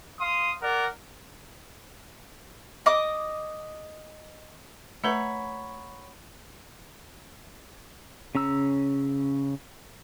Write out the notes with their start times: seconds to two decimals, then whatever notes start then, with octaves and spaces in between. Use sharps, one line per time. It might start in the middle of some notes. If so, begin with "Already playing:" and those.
0.21 F5 C6 D#6
0.62 A#4 D5 F#5
2.86 D#5 D6 D#6
5.04 A3 B4 C#5 F#5 A#5 B5
8.35 C#3 C#4 A#5 E6